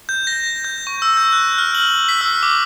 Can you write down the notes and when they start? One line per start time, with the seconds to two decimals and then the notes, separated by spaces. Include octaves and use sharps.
0.09 G6
0.27 A#6
0.64 G6
0.87 C#6
1.02 E6
1.17 G6
1.33 F#6
1.58 F6
1.75 F#7
2.09 B6
2.21 E6
2.43 D6